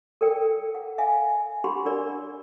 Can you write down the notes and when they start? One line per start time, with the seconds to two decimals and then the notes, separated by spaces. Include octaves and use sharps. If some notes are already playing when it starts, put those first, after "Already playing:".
0.21 A4 A#4 D5 G5
0.75 F#5
0.98 E5 F5 G#5
1.64 D4 G4 F#5 B5 C6
1.85 D4 A#4 D5